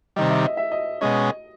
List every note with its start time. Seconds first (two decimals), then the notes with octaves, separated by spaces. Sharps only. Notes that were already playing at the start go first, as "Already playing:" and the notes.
0.16 C3 D#3 G3 D#5
0.30 E5
0.43 D#5
0.57 E5
0.72 D#5
1.01 B2 G#3 C#4 D#5